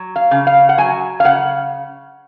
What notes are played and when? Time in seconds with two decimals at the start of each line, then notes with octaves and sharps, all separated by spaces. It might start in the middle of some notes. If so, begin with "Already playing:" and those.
Already playing: F#3
0.16 F5
0.31 C#3
0.47 F5
0.69 F#5
0.78 F#3 G#5
1.20 F5
1.24 C#3 F#5